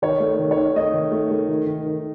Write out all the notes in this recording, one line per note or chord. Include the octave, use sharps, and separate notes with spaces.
D#3 C#5
A3
D#3
C#5
D#3
A3 D#5
D#3
A3
A3
D#3
D#3
D#3